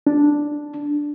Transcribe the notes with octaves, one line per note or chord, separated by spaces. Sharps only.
D4